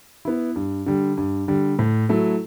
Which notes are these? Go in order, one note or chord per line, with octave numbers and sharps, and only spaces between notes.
B3 E4
G2
D3 G3
G2
D3 G3
A2
F#3 A3 E4